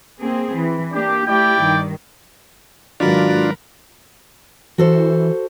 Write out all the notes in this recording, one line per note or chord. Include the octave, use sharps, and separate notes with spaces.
A#3 C4 G#4
E3
A#3 D4 G4
A3 E4 G4 D5 G5
G2 D#3
G#2 D#3 F#3 D4 F4 F#4 A#4 B4
E3 F#4 A4 C5